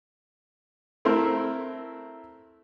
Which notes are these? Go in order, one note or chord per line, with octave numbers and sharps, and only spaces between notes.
A3 C4 E4 A#4